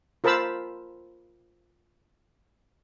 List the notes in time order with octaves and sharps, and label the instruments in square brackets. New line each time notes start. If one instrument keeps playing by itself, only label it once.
[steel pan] F4 A#4 C5 A5 B5 E6